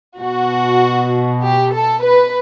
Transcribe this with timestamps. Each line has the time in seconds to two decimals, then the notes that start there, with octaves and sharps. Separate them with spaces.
0.20 B2 F#4
1.42 G4
1.72 A4
2.03 B4